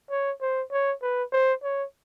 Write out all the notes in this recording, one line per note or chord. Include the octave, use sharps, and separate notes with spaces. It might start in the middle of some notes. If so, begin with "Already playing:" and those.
C#5
C5
C#5
B4
C5
C#5